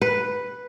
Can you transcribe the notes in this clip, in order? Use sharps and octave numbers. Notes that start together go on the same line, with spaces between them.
B4